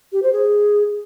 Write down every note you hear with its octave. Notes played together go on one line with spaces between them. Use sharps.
G4
C5
G#4